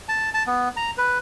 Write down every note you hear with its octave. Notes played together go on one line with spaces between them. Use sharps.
A5
A5
B3
A#5
B4